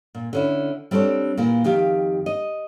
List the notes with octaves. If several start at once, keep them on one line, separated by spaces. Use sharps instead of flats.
A#2
D3 C#4 E4
G3 C4 D4 A4 C#5
A#2 E3 A#3
F2 D#3 G4 F5
D#5